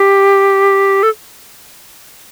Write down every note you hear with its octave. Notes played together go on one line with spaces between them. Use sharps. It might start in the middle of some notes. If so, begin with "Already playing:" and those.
Already playing: G4
A4